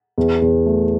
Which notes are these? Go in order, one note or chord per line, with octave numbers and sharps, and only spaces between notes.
E2
E2
A3